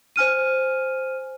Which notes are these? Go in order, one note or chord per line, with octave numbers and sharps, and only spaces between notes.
C5 G#5 F6 D#7